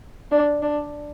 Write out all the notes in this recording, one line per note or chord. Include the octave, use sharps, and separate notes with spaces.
D4
D4